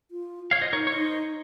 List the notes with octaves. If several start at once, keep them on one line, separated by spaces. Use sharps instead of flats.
F4
C#5 F5
C5 D#5
D#4 A#4 C#5
C#5
D#4 C5 D#5